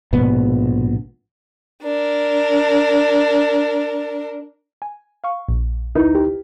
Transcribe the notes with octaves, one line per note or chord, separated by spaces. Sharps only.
A#1 G#2 B2 B3
D4 A#4
G#5
F5 C#6
A#1
D2 D#4 E4 A#4 B4
G4 A#4